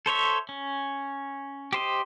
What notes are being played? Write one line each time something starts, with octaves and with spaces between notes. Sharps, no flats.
A4 C5 C#5 E5
C#4
G4 C5 D#5